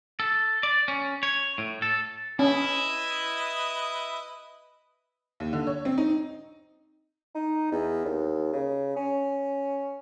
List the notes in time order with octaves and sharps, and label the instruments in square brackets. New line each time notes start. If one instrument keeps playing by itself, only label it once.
[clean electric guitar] A4
D5
C#4
C#5
A2
A4
[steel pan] C#4 [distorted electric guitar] E4 [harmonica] B4 D#5 D#6
[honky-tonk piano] D#2
D3
C#5
C4
D#4
[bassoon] D#4
E2
D#2
C#3
C#4